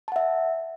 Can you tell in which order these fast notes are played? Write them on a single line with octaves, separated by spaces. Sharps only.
A5 F#5 E5